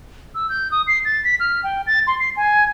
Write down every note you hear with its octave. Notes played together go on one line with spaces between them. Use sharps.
E6
G6
D#6
C7
A6
B6
F6
G5
A6
C6
C7
G#5